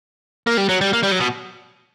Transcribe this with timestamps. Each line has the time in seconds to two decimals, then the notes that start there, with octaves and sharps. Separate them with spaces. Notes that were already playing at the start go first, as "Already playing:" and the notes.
0.47 A#3
0.57 G3
0.69 F#3
0.81 G3
0.93 A#3
1.03 G3
1.12 F#3
1.21 B2